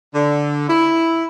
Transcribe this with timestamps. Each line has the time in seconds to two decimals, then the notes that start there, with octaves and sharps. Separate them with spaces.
0.15 D3
0.69 E4